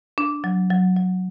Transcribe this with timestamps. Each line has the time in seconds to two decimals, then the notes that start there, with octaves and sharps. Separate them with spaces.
0.18 D4
0.44 F#3
0.70 F#3
0.96 F#3